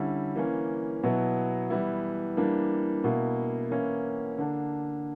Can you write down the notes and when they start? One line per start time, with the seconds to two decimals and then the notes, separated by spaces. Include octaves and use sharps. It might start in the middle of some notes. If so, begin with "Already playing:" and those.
Already playing: D3 G3 C#4 E4
0.36 E3 A#3 C#4
1.03 B2 F#3 B3 E4
1.70 E3 G3 B3 E4
2.37 E3 G3 A#3 D4
3.04 B2 A#3 E4
3.71 E3 A#3 C#4 E4
4.38 D3 A#3 D4